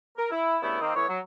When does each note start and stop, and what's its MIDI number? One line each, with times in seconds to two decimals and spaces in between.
0.17 0.29 70
0.31 0.57 64
0.63 0.77 43
0.63 0.77 49
0.63 0.77 57
0.63 0.77 59
0.63 0.77 64
0.81 0.93 51
0.81 0.93 58
0.81 0.93 60
0.81 0.93 75
0.96 1.08 45
0.96 1.08 52
0.96 1.08 59
0.96 1.08 64
0.96 1.08 73
1.09 1.19 54